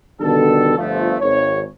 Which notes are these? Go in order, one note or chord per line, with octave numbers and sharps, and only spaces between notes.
B2 D3 D#3 G3 A4
G1 F3 A3
G#1 C#5